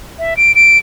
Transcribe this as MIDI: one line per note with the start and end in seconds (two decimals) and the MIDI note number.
0.19 0.37 76
0.37 0.55 98
0.55 0.78 98